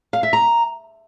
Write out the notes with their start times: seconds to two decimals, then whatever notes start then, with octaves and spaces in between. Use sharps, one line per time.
0.13 F5
0.23 E5
0.33 A#5